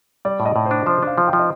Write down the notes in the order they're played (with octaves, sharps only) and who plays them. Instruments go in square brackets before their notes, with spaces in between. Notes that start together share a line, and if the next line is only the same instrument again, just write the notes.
[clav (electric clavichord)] G3 [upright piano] D5
[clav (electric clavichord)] A2
[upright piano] D#5
[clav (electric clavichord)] A2
[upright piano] C5
[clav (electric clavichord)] D4
[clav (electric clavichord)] F3 [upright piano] C5
[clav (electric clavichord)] D4 [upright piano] F5
[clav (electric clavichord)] F3
[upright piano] G5
[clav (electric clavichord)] F3
[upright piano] D#5